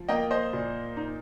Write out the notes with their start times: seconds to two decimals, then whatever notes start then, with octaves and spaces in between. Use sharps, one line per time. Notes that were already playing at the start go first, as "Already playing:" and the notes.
Already playing: F3
0.08 A#3 D#5 G5
0.31 C5 D#5
0.53 A#2
0.97 D#4